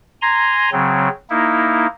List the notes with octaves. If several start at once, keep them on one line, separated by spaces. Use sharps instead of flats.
G#5 A#5 C6
C#3 F#3 C4
A#3 D#4 E4